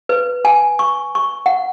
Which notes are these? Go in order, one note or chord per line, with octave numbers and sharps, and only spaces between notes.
B4
G#5
C#6
C#6
F#5